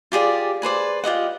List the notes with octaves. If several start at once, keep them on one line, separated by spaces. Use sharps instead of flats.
F4 G4 G#4 D5
G#4 B4 C5 D5
F4 G4 D#5 F#5